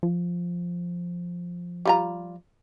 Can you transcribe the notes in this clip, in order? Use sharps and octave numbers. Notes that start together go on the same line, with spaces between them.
F3
G3 F4 A#5